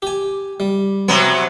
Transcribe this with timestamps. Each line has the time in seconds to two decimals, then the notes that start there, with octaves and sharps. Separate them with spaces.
0.02 G4 G#5
0.60 G3
1.08 C3 F#3 B3 A#5